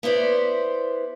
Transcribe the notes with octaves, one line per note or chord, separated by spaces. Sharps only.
B3 E4 C5 D5